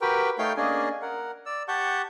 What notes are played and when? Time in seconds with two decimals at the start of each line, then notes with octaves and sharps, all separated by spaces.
0.01 F#4 G4 A#4 B4 G5
0.38 A3 D#4 C#5 F5 G5 G6
0.57 A#3 C#4 D4 G#4 D#5 G#5
1.02 A#4 F#5
1.46 D5 E6
1.68 G4 F#5 A5 C#6 G6